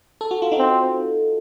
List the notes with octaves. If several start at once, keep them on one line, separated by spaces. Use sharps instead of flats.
A4
F#4
F4
D#4 F#4
C4